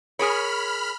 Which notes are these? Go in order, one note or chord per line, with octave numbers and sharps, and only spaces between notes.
G#4 A#4 C#5 B5 F6